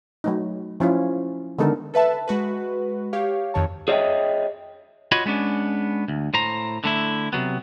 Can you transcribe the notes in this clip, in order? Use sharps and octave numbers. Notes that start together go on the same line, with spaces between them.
F#3 A3 D#4
F3 C#4 E4 F4
D3 D#3 G#3 B3 A4 A#4
A4 B4 E5 A5
G#3 F#4 B4
G4 C#5 F5
F2 D#3 C#5 A5
G#4 C#5 D#5 E5 F#5 G5
F4 F#4 C#5 D#5 B5
G#3 B3 C#4 D4
D2
A2 C5 A#5
D3 A3 E4
C3 D#3 F#3 B3